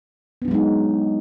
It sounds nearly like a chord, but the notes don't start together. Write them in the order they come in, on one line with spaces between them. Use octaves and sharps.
B3 D4 F#3 G#3 D#4